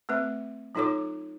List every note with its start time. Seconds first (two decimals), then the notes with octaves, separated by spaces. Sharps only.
0.09 A3 C4 B4 E5
0.75 F#3 D#4 F4 A4 C#5 D6